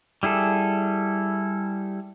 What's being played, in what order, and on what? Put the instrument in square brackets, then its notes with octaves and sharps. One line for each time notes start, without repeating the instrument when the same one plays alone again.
[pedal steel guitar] G3 E4 G#4 A4